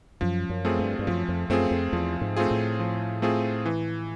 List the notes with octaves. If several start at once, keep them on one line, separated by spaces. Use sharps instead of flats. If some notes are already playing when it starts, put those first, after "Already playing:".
F#2 F3
F#2
A3 C4 F4 G#4
G2
G2
F#2 F3
F2
F#2 A3 C4 F4 G#4
F2
E2 F3
G#2
A3 C4 F4 G#4
A2
F3
A3 C4 F4 G#4
E3